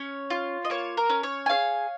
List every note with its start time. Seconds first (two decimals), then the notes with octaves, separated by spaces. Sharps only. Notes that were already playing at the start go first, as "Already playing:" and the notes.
Already playing: C#4 C#5
0.30 F4
0.65 D#5
0.70 A#3 C#5
0.97 A#4
1.10 C#4
1.23 C#5
1.46 G#5
1.49 G#4 C#5 F5